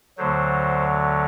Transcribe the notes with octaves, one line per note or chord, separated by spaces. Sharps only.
D2 D3 F#3 C5